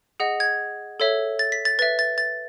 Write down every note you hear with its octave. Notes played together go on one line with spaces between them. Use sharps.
G#4 D#5 F#5
G#6
A4 C#5 E5
A6
B6
A6
B4 E5 A6
A6
A6